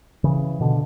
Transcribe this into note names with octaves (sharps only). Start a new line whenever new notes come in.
C#3 E3
B2 D3